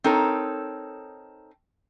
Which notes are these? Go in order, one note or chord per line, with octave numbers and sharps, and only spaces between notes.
C4 D#4 A4 A#4 C#5